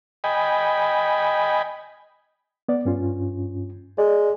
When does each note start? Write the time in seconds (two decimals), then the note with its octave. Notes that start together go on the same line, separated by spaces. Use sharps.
0.24 D#5 G5 G#5 B5
2.69 B3 D5
2.85 G2 C#4 F4
3.98 G#3 D5